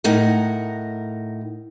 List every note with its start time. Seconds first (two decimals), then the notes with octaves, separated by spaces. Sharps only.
0.04 A2 D#4 A#4 F#5